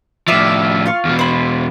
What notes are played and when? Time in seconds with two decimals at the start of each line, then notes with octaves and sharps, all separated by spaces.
0.28 A2 F3 D5 E5 F5
0.86 F4 F5 C#6
1.05 E2 B2
1.19 C5 B5